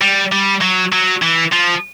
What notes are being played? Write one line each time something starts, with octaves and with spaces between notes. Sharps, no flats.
G3
G3
F#3
F#3
E3
F3